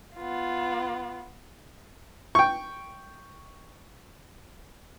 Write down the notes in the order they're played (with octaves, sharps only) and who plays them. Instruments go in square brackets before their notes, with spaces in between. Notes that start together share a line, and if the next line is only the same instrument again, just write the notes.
[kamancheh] B3 F4
[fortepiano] G5 C#6